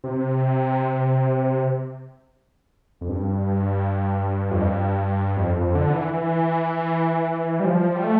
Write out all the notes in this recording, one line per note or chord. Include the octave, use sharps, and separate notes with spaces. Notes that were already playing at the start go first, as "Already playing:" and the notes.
C3
F2
G2
F2
G2
F2
F2
D3
E3
E3
G3
F3
G3
A3